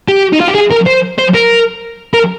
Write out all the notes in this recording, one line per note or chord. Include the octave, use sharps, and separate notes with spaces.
G4
D#4
F4
G4
G#4
A#4
C5
C5
A#4
A#4